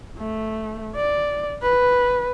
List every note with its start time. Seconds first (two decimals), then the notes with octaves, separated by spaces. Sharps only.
0.18 A3
0.95 D5
1.62 B4